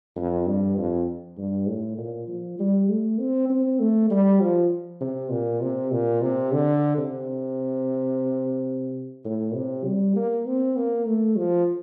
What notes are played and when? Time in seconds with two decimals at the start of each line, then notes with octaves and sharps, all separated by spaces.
0.16 F2
0.47 G2
0.77 F2
1.38 G2
1.68 A2
1.98 A#2
2.28 F3
2.59 G3
2.89 A3
3.19 C4
3.50 C4
3.80 A3
4.11 G3
4.41 F3
5.01 C3
5.31 A#2
5.61 C3
5.91 A#2
6.22 C3
6.52 D3
6.98 C3
9.25 A2
9.55 C3
9.85 G3
10.16 A#3
10.46 C4
10.76 A#3
11.07 A3
11.37 F3